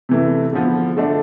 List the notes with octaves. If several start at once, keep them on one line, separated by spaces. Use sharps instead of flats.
C3 E3 A3
D3 F3 B3
D3 A3 D4